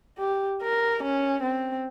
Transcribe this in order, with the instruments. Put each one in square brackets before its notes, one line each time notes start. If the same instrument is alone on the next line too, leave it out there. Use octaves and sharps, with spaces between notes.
[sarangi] G4
A#4
C#4
C4